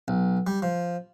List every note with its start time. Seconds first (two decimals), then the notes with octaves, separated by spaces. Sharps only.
0.08 B1
0.47 G3
0.62 F3